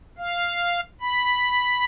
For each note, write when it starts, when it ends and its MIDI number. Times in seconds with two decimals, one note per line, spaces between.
0.18 0.80 77
1.01 1.85 83